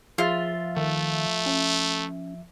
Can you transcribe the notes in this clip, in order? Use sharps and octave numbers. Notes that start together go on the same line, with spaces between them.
F3 F4 G#4 E5 A6
D#3 A3
C#4